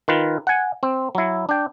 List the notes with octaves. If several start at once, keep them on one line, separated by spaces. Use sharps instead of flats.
D#3 F4 B4
F#5 G#5
C4
F#3 E4
D4 G5